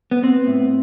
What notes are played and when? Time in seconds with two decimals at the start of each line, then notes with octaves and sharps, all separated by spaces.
0.11 B3
0.23 B3 C4
0.47 A2